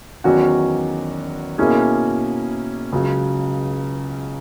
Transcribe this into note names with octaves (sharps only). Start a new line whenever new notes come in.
E2 D#3 F#3 C#4 F#4
B2 A#3 C#4 E4 G#4
C#2 C#3 F#3